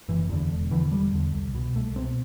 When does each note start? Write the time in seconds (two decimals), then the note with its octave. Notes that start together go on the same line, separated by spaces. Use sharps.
0.08 F#1 E3
0.29 E2 D3
0.51 E1
0.71 E2 D3 E3
0.92 E1 G3
1.13 E2 D3
1.34 C2
1.55 B2
1.75 C2 A3
1.96 B2 C4